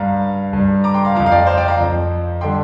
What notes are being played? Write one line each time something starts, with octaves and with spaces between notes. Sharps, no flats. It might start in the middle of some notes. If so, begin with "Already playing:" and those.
Already playing: G2 G3 F5 A#5
G2 G3
A#5 D6
G5 C6
F5 A#5
F2 F3 F5 A#5
F5
D5 G5
C5 F5
D5 G5
F5 A#5
F2 F3
D3 G3 G5 C6